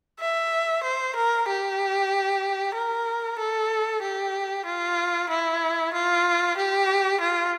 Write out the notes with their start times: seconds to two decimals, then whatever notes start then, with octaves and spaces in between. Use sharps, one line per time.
0.20 E5
0.83 C5
1.16 A#4
1.48 G4
2.74 A#4
3.38 A4
4.02 G4
4.66 F4
5.30 E4
5.93 F4
6.57 G4
7.21 F4